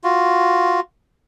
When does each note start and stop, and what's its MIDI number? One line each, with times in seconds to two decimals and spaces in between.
0.04 0.80 65
0.04 0.80 66